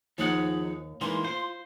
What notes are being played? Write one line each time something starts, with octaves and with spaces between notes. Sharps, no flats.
D#2 F3 D#4 G#4 F#5
E3 G#3 A#3 D#4 C6
F4 C5